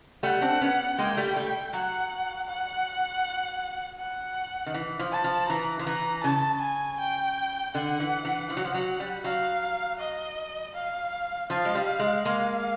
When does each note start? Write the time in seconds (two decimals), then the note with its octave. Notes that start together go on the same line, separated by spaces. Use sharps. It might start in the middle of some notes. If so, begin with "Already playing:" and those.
0.23 G3 A3 F#5
0.41 C4 D4
0.61 B3 C#4
0.98 G#3 A#3 G5
1.17 G3 A3
1.36 G3 A3
1.73 F#3 F#5
2.49 F#5
3.99 F#5
4.66 D#3
4.74 E3
4.99 F3
5.12 A5
5.24 F3
5.49 E3 A#5
5.79 F3
5.86 E3 A#5
6.24 C#3 A5
6.62 G#5
7.00 G5
7.74 D3 F#5
8.00 E3
8.25 E3
8.49 F3 F#5
8.57 F#3
8.65 F3
8.74 F#3
9.00 G3
9.24 F#3 F5
10.00 D#5
10.75 F5
11.50 F3 F5
11.65 G#3
11.75 G3
11.99 G#3
12.25 G#3 A#3 F5